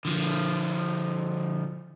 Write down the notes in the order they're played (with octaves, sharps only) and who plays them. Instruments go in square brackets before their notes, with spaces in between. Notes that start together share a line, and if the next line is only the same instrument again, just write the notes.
[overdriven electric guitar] D3 F3